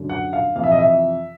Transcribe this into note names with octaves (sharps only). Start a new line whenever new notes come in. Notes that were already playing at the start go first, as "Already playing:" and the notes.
Already playing: F#2 D3
F#5
F5
F2 C3 E3 F5
E5
D#5
E5